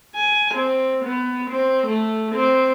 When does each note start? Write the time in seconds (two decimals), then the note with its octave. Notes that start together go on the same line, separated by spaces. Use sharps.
0.15 G#5
0.54 C4
1.05 B3
1.50 C4
1.87 A3
2.35 C4